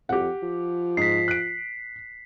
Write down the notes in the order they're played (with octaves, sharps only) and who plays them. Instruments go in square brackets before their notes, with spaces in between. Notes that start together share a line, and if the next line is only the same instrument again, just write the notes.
[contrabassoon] F2 [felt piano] G4 F#5
[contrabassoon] F3
[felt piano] G#2 [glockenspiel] B6 C7
[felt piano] F#6 D7